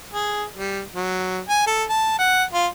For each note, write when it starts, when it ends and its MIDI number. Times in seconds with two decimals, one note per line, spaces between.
0.13 0.44 68
0.57 0.81 55
0.94 1.40 54
1.48 1.64 80
1.67 1.84 69
1.89 2.15 81
2.19 2.44 78
2.53 2.67 65